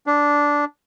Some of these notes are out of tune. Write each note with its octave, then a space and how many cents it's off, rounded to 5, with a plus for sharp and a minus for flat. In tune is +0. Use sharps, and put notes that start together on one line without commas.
D4 -10